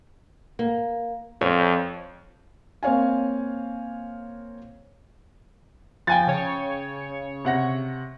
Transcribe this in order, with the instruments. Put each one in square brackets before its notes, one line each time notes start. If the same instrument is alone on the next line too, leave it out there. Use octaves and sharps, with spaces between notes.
[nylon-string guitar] A#3
[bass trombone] F2 [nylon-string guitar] C#5
[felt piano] A#3 C4 C#5 F5 G#5
[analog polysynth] F3 [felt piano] G5 G#5 A6
[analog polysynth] C#3 C#5
[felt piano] C3 F#5 A#6